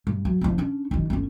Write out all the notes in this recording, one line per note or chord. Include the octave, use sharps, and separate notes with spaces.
G2
F#3
F#1 F3
C#4 D4
F#1 D#3
G1 C#4